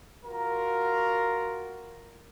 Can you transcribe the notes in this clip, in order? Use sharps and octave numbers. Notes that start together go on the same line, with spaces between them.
F4 F#4 A#4